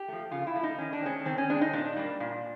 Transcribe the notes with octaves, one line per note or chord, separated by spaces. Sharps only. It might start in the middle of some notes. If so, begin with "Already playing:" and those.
Already playing: G4
F3 A3
C#3 F4
E4
F3 A3
D#4
D#3 C#4
D4
G#3 C4 C#4
D#3 C4
C#4
G#3 C4 D4
D#4
A#2 D4
G3 A#3
A#2